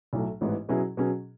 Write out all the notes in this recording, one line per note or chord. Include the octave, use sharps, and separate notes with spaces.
B1 A2 F#3 A3
A1 G#2 E3 B3
B2 F#3 C#4 E4 G#4
B2 F#3 C#4 G#4